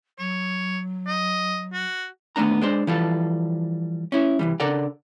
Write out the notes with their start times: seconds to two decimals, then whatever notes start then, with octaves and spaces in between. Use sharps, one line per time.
0.19 F#3 C#5
1.07 D#5
1.73 F#4
2.36 D#2 A3 B3 D4 A#5
2.62 G#3 D4 C5
2.87 E3 F3 G3 A4
4.12 C#4 E4
4.39 C2 E3 G3
4.60 C#3 D4 A4 A#4 D5 F#5